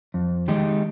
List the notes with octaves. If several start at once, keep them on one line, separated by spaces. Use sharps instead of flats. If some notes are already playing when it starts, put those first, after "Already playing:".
F2
D#3 G#3 D#4 G4